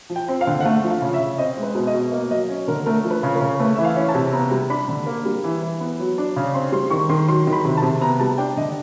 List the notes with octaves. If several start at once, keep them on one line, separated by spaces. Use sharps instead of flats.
F3
G5
C4
F5
D3
F#5
A3 F5
F3
F5
C#3
E5
C#3
C4 D#5
G#3
B4
B2
D#5
B2
A#3 D#5
F#3 D#5
C#4 C#5
D3 A#4
A3 A#4
F3
B4
C#3
A#4
C#3
A3 B4
E3 E5
F5
C#4
A5
C3
B3 A#5
G3
D4 B5
D3
A#3
G3
E3
E3
B3
F#3
D4
C#3
C4 C6
G3 C6
D#3 C#6
D#3 C6
F#3 C6
D#3
B5
C3
A5
C3
B3 A#5
G3 A5
D4 G5
D3 D#5